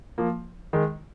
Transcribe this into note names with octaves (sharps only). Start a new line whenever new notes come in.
F3 A#3
D#3 G#3